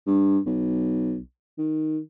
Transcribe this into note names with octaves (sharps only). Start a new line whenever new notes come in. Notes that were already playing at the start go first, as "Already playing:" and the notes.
G2
B1
D#3